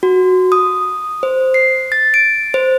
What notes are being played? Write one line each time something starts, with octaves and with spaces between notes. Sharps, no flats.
F#4
D#6
C5
C7
A6
D7
C5